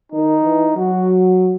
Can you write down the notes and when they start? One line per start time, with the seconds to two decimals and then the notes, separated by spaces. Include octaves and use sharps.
0.12 D#3 D#4
0.44 E3
0.76 F#3 F#4